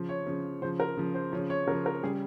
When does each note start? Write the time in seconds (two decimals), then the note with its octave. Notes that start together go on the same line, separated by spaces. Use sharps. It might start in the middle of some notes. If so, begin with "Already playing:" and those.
Already playing: C#3 F3
0.09 C#5
0.27 C#3 F3
0.62 C#3 C5
0.65 F3
0.80 A#4
0.97 C#3 F3
1.15 C5
1.32 C#3 F3 C#5
1.50 C#5
1.67 C#3 A#4
1.71 F3
1.86 A#4
2.03 C#3 G3 G#4